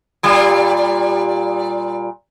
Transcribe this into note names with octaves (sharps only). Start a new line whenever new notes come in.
A#2 G3 F4